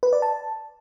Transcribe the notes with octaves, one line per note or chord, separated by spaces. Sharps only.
B4
D5
A5